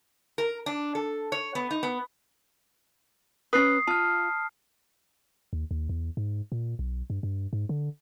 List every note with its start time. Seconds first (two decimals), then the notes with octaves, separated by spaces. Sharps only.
0.38 A#4
0.66 D4
0.95 A4
1.32 C#5
1.55 B3
1.71 D#4
1.83 B3
3.53 C#4 D4 B4 D#6 C7
3.87 F4 A5 F6
5.53 D#2
5.71 D#2
5.89 E2
6.17 G#2
6.52 A#2
6.79 B1
7.10 G2
7.23 G2
7.53 G#2
7.69 D3